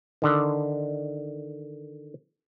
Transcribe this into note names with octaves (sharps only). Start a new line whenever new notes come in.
D3 D#3